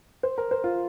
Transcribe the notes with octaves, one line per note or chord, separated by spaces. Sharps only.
C5
A#4
C5
F4